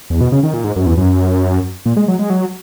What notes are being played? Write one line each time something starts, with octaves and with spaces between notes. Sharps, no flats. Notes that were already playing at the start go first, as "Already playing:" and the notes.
E2
B2
C#3
D#3
A#2
G#2
F#2
E2
F#2
A#2
G#3
F#3
G#3
F#3